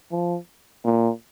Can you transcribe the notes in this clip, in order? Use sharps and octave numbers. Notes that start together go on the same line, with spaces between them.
F3
A#2